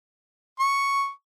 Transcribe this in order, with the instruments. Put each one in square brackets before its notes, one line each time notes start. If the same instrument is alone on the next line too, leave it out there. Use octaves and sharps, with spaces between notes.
[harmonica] C#6